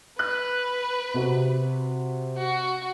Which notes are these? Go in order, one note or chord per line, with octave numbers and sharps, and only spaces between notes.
B4 F#6
C3 F#4
F#4